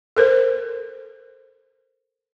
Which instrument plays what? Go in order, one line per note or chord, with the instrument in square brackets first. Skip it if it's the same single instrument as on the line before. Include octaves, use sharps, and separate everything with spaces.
[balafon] A4 A#4 C5